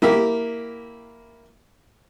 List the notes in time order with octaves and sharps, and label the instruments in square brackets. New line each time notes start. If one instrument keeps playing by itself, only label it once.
[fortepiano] A#3 E4 G4